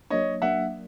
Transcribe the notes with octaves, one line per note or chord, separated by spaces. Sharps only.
F#3 A#3 D4 C#5 D#5
F#3 A#3 D4 E5 F#5